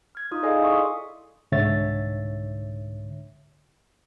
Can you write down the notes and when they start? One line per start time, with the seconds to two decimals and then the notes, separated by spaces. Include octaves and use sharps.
0.15 F6 G#6
0.31 D#4 F4 D#6
0.43 G#4 A4 D5 D#5 F5 G#5
0.62 E4 E5 C6 C#6 D#6
1.52 C2 G#2 D3 C#5 E5 A6